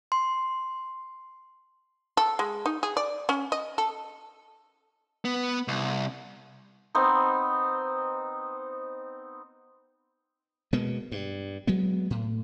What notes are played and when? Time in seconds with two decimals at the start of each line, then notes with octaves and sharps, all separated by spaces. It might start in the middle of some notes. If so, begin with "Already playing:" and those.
0.12 C6
2.17 A4
2.39 G#3
2.66 D#4
2.83 G#4
2.97 D5
3.29 C#4
3.52 D#5
3.78 A4
5.25 B3
5.68 C2
6.95 B3 C4 D#4
10.73 B2 G#3 A#3 B3
11.12 G2
11.67 F#3 G#3 B3
12.10 A2